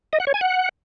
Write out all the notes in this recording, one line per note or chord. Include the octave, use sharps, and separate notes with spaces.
D#5
F#5
C#5
G#5
F#5